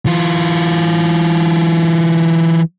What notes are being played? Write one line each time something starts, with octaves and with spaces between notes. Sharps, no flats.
E3 F4